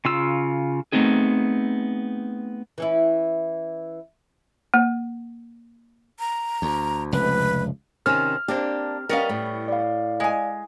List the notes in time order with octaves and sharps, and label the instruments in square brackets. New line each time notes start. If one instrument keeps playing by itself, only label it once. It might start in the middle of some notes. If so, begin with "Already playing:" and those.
[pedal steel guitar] C#3 F4 E6
[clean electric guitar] A3 B3 C4 D#4 G#4
[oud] E3 C#4 E4
[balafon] A#3
[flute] A#5
[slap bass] D2
[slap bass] F1 C#2 [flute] B4
[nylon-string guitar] C3 D#3 C#4 [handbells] F6
[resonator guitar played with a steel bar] A#3 D4 [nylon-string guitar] C4 G4
[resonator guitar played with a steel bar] G3 B3 C#4 [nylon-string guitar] A#4 D#5 F5
[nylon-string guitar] A2
[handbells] D5 F5
[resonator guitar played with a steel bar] G#3 G#5